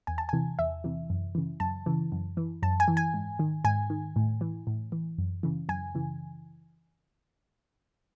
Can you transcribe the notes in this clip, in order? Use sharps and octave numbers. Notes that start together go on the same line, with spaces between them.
E2 G#5
A5
C3 E3 G#5
E2 E5
C3 E3
F#2
C#3 E3
F#2 A5
C#3 E3
F#2
E3
F#2 A5
G#5
E3
G#5
G#2
D#3
G#2 G#5
D#3
A2
E3
A2
E3
F#2
C#3 E3
F#2 G#5
C#3 E3